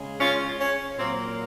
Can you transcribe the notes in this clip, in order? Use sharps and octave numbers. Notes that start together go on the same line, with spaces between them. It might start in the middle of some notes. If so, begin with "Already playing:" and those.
Already playing: C#3 G#3
C#4 F4
C#4
A#2 F#3 A#3 C4